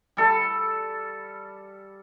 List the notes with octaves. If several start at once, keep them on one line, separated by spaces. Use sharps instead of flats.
G3 A4